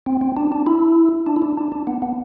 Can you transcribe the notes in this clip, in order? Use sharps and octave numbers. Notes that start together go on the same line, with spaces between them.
C4
C4
D4
D4
E4
D4
E4
D4
D4
D4
B3
B3